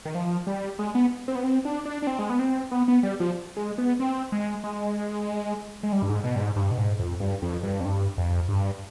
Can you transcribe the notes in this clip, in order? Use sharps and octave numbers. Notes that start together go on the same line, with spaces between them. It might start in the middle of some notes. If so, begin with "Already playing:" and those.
D#3
F3
G3
G#3
B3
C4
B3
C4
D4
D4
D4
C4
G#3
B3
C4
B3
B3
G3
F3
G#3
B3
C4
G#3
G#3
G#3
G3
G2
G#2
B2
G2
G#2
G2
B2
G#2
F2
G2
F2
G2
F2
G2
F2
G2